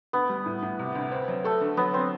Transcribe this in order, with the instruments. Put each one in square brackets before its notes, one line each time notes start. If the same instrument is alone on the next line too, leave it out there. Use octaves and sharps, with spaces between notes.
[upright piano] D2 [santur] B3
[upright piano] G3
A2
A2
C3
D2
C4
F#3
[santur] A3 [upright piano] A4
[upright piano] D3
[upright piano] F#3 [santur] B3
[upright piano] F#3 [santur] C4